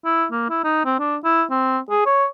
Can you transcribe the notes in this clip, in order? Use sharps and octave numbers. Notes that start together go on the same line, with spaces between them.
E4
A#3
E4
D#4
C4
D4
E4
C4
G#4
C#5